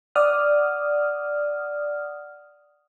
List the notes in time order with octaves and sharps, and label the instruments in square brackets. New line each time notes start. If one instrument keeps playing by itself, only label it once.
[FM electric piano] D5 F#5 D#6 F6